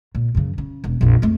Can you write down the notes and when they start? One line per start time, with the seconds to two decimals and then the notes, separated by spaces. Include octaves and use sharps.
0.15 A#2
0.35 F#2 C#3
0.58 C#3
0.84 E1
1.01 A#1 F2
1.22 F2 A3